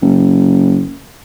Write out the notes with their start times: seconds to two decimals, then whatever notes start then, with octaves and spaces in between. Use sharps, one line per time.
0.02 F#1